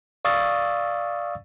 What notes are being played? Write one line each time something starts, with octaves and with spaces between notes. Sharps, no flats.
D5 F5 C#6 D#6 E6 A6